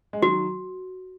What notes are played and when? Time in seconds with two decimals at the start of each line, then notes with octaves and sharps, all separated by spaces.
0.13 G#3
0.22 D#3 F#3 F#4